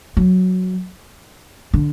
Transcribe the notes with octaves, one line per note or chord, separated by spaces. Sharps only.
F#3
D3